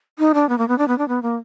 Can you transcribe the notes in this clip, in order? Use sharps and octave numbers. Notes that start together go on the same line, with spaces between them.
D#4
D4
B3
A#3
B3
D4
B3
D4
B3
A#3